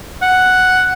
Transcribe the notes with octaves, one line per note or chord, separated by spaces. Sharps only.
F#5